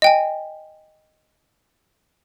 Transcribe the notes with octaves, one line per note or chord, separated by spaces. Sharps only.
D#5 G5 G#5